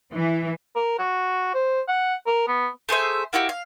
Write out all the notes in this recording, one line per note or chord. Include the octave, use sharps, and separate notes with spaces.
E3
A#4
F#4
C5
F#5
A#4
B3
A3 G#4 C5 E5
A#3 E4 F#4 G4
F5